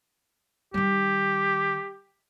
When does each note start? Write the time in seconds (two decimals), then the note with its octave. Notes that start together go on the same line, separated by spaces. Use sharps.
0.74 D#3 G3 G4